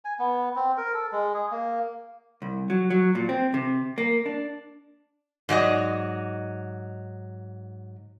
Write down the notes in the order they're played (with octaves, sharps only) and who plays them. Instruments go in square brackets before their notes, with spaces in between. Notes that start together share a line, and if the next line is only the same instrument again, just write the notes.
[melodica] G#5
B3
C4
A#4
A4
G#3
G#4
A#3
[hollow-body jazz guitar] C2
F#3
F#3
A#2
C4
C3
A#3
D4
[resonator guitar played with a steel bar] G#2 F#3 D5 D#5